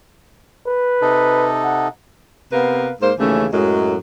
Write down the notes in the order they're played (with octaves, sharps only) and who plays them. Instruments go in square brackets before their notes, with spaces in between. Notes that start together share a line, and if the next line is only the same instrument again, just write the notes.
[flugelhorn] B4
[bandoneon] C3 D#4 A4
[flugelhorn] F#5
[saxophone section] C3 B3 A#4 B4 F5
G#2 A#3 C5
D#2 C#3 E3 A3 C#4
F#2 A2 F#3 G#3